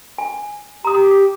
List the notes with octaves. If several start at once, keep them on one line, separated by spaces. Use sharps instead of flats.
G#5
G4 A#5 D#6